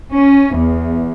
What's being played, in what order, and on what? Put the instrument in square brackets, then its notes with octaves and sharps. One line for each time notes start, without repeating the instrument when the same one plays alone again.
[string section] C#4
E2